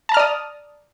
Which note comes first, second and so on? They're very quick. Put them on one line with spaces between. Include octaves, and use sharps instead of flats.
A5 A#5 F6 D5 D#6